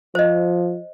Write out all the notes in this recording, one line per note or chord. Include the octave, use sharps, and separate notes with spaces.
F3 C5 D#5